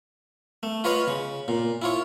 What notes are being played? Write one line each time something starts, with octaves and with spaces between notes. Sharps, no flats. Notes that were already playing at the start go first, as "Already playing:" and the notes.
A3
F4 B4 C#5 D#5 F5 F#5
C#3
A#2
E4 F4 C#5